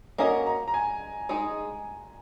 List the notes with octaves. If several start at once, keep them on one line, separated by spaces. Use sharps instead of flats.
A#3 C#4 F#4 A#4 D#5 A#5
A#5
A#5
G#5
G#3 D#4 G#4 D#5